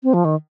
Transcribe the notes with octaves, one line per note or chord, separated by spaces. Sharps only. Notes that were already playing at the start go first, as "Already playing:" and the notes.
C4
F3
D#3